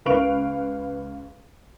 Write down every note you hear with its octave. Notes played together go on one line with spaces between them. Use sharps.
C#2 B4 F5 C#6 D7 F7